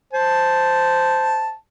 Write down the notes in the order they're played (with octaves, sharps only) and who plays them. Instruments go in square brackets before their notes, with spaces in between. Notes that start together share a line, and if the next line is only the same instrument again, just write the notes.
[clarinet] C5 [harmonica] A5